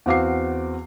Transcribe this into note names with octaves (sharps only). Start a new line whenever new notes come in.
E2 C4 F#4 F5 D6 C7